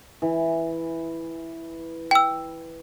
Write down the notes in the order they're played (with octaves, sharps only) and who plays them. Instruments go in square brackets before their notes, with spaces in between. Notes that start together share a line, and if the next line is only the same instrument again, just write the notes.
[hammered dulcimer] E3
[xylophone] G5 E6